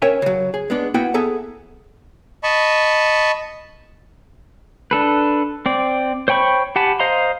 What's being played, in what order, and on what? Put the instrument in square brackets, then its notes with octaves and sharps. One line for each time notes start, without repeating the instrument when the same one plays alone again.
[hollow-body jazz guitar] C#4 A#4 C#5 E5 G5 G#5
C#3 F#3
G#4
G#3 B3 D4
A#3 B3 E4 F#4 F#5 G5
B3 G#4 A4 E5 A#5
[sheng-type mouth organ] D#5 A5 B5 C#6
[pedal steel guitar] D4 A4 B4
C4 D5
C5 C#5 G5 B5 C#6
G4 F#5 G#5 A5 B5
C5 D#5 F5 A#5 C6